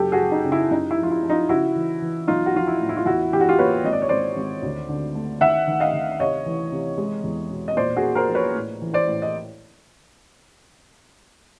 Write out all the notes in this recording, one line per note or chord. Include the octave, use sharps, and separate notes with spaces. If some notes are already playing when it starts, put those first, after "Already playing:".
Already playing: F#1 F#3 G4 A4
F#4 G#4
F#3
D#4
C#3
E4
F#2 D#4
E4
F3
F4
E4
F3
D#4 F4
C#3 E4 F#4
E3
E3
B1 D#4 F4
F#4
F3 F4
E4
A2
E4
F4
E2 E4 F#4
E2 G4
F#4
F4 G4
A#3 B4 C#5
G#1 D#5
D5
C#5
G#1 C5 D5
G#1
D2
D3
A3
D#3 E5 F#5
D#3
D#5 F5
D#3
C3 C#5 D#5
E3
C3
G#3
E2
B2
D#5
A#2 C5 D5
F#4 G#4
A#3
A#4 C5
A#1
B4 C#5
A2
E3
C5 D5
A2
D#5